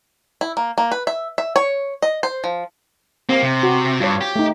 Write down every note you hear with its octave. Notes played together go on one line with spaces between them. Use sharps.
E4
A#3
A#3
B4
E5
E5
C#5
D#5
C5
F3
A#3 C4
C3
F#4
G2 F4 C#5
G4
A3 D#4